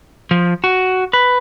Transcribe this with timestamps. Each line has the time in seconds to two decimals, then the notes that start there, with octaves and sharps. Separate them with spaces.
0.31 F3
0.64 F#4
1.13 B4